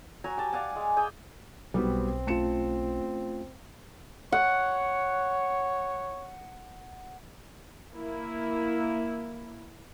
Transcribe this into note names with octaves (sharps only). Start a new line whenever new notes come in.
F#3 G#5 A#5
G4 G5 A5
D5 F5 F#5 G#5
G#3
G#4 G5 G#5
B1 G3 B3 C4 F#4
A3 C#4 F4 A5 C#7 E7
C#5 F#5
A#3 E4